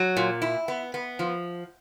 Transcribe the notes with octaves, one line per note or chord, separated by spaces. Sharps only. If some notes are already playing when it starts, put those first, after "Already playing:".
Already playing: F#3
A#2
E4
B3
B3
F3